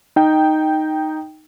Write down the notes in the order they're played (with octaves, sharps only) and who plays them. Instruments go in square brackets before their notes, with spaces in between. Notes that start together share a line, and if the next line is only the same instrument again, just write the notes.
[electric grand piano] D#4 G5